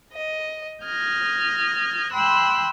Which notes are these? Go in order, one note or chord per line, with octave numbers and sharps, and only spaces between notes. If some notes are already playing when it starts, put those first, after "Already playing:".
D#5
D#6 F6 G6 G#6 A#6
G5 B5 C6 E6 F#6